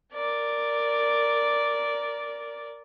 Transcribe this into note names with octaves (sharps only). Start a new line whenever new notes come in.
A#4 D5